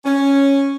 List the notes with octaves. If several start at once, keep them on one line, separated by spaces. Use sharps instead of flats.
C#4